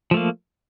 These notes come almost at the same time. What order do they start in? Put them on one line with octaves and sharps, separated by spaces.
F3 A3 A#3